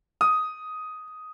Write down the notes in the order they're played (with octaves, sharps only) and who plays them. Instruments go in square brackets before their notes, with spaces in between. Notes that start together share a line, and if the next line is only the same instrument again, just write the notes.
[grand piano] D#6